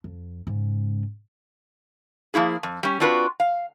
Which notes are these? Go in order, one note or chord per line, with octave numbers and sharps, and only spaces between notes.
F2
G#2 C#3
F3 A#3 E4 G#4
F2
G3 C#4
C4 D4 F4 F#4 A4 B4
F5